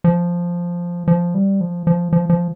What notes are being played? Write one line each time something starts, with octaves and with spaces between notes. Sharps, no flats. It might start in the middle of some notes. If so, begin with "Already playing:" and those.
F3
F3
G3
F3
F3
F3
F3